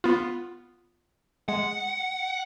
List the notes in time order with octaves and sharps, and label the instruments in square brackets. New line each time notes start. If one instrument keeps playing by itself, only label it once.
[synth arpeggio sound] B3 F4
[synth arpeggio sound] G#3 [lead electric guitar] F#5